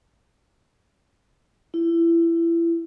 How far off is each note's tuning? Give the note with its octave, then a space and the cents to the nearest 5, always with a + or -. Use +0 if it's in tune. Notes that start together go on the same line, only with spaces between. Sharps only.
E4 +25